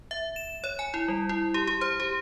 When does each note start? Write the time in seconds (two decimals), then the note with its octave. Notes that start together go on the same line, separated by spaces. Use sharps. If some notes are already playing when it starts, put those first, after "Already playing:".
0.11 E5
0.36 E7
0.64 C#5
0.79 G#5
0.94 E4
1.08 G3
1.29 E4
1.54 G4
1.67 G4
1.81 C5
2.00 G4